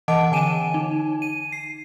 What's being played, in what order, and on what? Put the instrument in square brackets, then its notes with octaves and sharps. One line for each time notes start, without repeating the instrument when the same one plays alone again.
[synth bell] E3 D#5 F#5 A5 D6 D7
D3 G#5 D#7 E7
D#4
D#7
C7